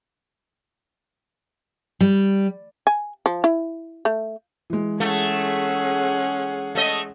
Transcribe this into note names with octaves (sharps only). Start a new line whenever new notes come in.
G3
G#5
F3
E4
A3
E3 G#3
A3 C#4 G#4 F#5
A3 D#5